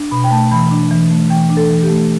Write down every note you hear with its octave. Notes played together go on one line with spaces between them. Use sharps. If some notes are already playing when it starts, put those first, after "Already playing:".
Already playing: D4
B2 B5
G5
A3 A5
E3 B5
D4
E3
A3
E3 G5
D4
A4
E3
G4
A3